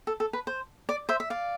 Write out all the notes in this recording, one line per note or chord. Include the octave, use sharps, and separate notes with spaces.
A4
A4
B4
C5
D5
C5 E5
E5
D5 F5